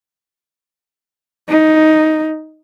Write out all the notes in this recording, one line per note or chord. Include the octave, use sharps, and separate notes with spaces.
D#4